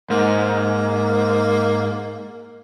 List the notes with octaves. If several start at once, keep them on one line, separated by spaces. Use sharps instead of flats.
G#2 A#3